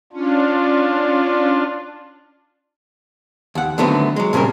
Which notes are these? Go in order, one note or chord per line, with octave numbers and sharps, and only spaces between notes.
C#4 D4 F4
D#2 F#5
D3 D#3 F#3 A3 B3 C4
F#3 G#3
G2 A#2 C#3 C4 A#4